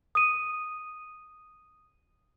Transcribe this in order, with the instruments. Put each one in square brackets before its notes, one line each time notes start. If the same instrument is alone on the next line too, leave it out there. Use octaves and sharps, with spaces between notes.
[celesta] D#6 D#7